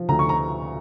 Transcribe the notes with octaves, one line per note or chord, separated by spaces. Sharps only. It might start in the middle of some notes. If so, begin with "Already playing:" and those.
Already playing: F3
D2 A#5
C#6
A#5